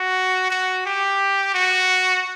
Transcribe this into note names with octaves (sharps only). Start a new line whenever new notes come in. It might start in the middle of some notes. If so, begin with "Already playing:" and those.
Already playing: F#4
F#4
G4
F#4